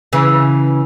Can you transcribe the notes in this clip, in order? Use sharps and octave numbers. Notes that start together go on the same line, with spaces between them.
C#3 E3